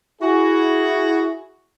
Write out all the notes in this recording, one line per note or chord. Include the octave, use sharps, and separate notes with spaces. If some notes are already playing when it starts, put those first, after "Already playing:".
E4 F#4 G#4